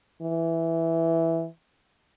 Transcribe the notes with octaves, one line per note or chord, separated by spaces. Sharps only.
E3